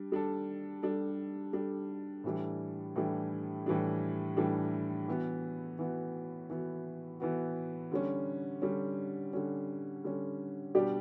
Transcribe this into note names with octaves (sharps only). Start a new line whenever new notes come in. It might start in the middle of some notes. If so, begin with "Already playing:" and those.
Already playing: G3 D4
G3 D4 A4
G3 D4 A4
G3 D4 A4
A2 E3 G3 D4
A2 E3 G3 D4
A2 E3 G3 D4
A2 E3 G3 D4
E3 B3 F#4
E3 B3 F#4
E3 B3 F#4
E3 B3 F#4
D3 G3 C#4
D3 G3 C#4
D3 G3 C#4
D3 G3 C#4
B2 G3 D4 G4 D5